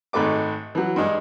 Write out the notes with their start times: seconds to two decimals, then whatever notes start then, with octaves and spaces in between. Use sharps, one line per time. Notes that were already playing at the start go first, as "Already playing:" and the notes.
0.13 G#1 G#2 A3 B4 D6
0.75 E3 F#3
0.96 G2 G#3